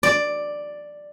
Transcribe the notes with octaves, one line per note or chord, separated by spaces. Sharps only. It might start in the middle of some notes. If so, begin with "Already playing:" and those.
D5